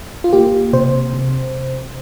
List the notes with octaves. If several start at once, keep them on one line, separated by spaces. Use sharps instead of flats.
F4
A#3 G4
C3 C5
C3